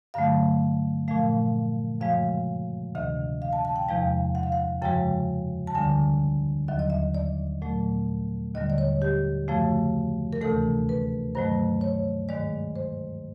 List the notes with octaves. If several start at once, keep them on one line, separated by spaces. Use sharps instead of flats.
G2 D3 F#3 A3 F5
A#2 F3 A3 F5
F#2 C#3 F3 G#3 F5
D2 C3 D#3 E5
F5
A5
A5
G5
E2 C3 F3 G#3 F5
F#5
F5
F#5
F#2 C#3 F3 G#3 G5
A5
D2 D3 G3 G#5
D#2 D#3 F#3 E5
D#5
E5
D5
A#2 F#3 A3
D#2 D3 G3 D#5
D5
C#5
G4
F#2 C#3 F3 A3
A#4
D2 C3 E3 A3 A4
B4
G2 D#3 F#3 A3 C5
C#5
G#2 D#3 G#3 D5
C5